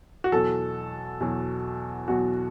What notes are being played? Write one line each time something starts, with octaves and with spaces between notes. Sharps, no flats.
F#4
E2 B2 F#3 A4
E2 B2 F#3
E2 B2 F#3 F#4